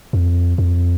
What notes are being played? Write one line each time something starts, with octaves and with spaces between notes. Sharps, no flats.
F2
F2